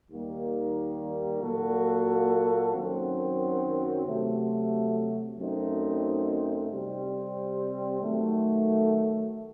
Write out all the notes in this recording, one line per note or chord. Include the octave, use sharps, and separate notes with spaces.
D#2 D#3 G3 A#3
A#2 F#3 A#3 F#4 A4
F#2 D#3 F#3 C4
C3 F#3 A3
F#2 F#3 A3 C4 D#4
C3 G3 C4
D#3 F#3 A3